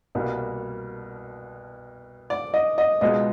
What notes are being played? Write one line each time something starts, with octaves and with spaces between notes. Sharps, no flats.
C2 B2 G3 A#3
D5
D#5
D#5
C#2 B2 G#3 B3 D#5